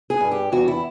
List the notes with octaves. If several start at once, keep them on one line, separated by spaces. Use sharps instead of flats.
G#4
G2
G4
E2 F#4
E4